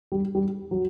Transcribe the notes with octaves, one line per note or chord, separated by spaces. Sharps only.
G3
G3
F#3